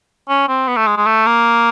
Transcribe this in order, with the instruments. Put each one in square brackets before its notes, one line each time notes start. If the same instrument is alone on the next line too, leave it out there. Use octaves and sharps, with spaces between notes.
[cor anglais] C#4
C4
B3
A3
G#3
G#3
A3
A#3